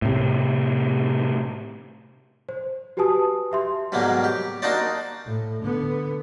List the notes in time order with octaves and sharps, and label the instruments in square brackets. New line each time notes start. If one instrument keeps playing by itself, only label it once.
[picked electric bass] A2 C3
[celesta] C5
F#4 G4 B4 G#5 A5 D#6
G4 E5 C6
[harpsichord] G#2 B2 F#3 G3 A#3
G4
A#3 D4 D#4 F#4 C5 D5
[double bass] A2
D3 B3